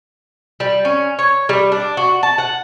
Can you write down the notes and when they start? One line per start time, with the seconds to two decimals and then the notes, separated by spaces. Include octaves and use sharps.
0.60 G3
0.85 C#4
1.19 C#5
1.49 G3
1.72 D4
1.97 F#4
2.23 A5
2.38 F#5